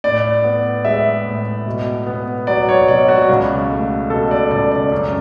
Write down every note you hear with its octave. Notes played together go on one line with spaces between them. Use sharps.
A2 D5
B3
G#3 E5
A2
B2
B3
F#3 D5
C#5
B2 D5
F#4
C#2
A3
B2 A4
D5
C#2 D5
D5
F#2